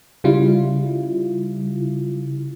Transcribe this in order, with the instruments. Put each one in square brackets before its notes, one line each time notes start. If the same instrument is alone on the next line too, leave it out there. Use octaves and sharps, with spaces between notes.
[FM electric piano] C#3 G3 E4 F4